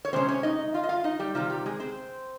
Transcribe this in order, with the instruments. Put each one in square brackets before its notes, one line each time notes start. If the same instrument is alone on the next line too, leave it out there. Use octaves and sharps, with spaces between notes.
[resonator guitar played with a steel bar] C#5
C3 F3 G#3 C4 C#4 C5
C#4 C#5
D#4 D#5
F4 F5
D#5
F4 F5
D#4 D#5
G3 G4
C3 D#3 G3 F4
G3 G4
G#3 G#4
C4 C5